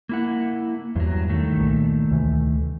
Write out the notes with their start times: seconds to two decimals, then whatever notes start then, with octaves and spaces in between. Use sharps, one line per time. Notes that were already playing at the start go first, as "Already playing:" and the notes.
0.09 A#3 E4 F#5
0.96 E2 G2 F#3
1.29 D#3 A3
1.56 C2 A#2
2.11 D2 C3 E3